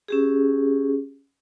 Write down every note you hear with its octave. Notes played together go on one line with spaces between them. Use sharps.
C#4 G4 G#4